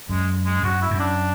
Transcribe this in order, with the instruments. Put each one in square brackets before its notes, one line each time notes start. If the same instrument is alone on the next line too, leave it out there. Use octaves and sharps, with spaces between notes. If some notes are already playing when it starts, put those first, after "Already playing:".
[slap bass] F#2 [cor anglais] G#3
[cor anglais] G#3
[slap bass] F#2 [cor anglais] F#4
[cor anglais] E4
[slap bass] F#2
[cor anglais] D4